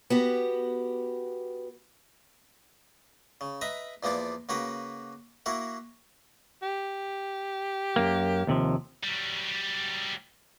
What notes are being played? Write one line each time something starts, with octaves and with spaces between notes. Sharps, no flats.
B3 F#4 G4
C#3
B4 D#5 E5 A#5
E2 F3 A#3 B3 D5
C#3 A#3 F#4 A#4 B4
A#3 E4 F#4 A#4
G4
F#2 A#3
D#2 C3 F3
F#3 G3